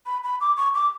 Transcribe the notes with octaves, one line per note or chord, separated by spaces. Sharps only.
B5
B5
D6
C#6
D6